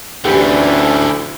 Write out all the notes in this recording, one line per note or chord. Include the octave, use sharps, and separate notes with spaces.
D2 D3 E3 C#4 G4